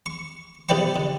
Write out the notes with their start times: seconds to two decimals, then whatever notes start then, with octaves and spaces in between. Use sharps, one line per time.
0.06 C#6
0.69 B1 G4 B4 D5 G5 C#6
0.96 D3